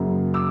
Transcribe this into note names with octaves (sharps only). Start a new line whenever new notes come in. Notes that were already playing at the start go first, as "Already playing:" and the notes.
Already playing: F#2 C#3 F#3 A#3
D6 E6